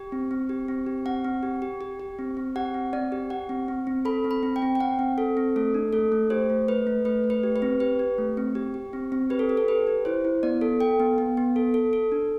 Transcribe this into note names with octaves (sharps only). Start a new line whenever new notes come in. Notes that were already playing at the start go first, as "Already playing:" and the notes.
Already playing: G4
C4
C4
G4
C4
G4
C4 F#5
C4
G4
G4
G4
G4
C4
C4
G4 F#5
C4
C4 D5
G4
G4 F#5
C4
C4
C4
A4 B5
C4
B5
C4
G5
C4
G5
C4 F#5
C4
A4
C4
A3 A4
D4
A3 A4
A3
G4 C5
A3
A3 B4
A3
A3 B4
A3
B4
G4
B4
C4
G4 B4
G4
A3
C4
G4
G4
C4
C4
G4 B4
A4
G4
A4
G4 B4
G4
E4 C5
E4
B3 D5
A4
A4 G5
B3
B3
B3
A4
A4
A4
D4